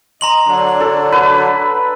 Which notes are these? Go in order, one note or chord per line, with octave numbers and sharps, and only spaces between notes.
D#5 A#5 C6 F#7
D3 F#3 D4
A4
B4